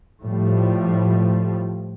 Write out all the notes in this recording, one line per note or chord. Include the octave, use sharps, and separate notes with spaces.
A2 F3 G3